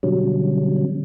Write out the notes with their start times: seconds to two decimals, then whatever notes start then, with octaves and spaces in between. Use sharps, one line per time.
0.03 B2 D3 F#3 G3 C#4